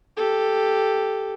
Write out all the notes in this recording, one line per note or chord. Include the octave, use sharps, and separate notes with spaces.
G4 A4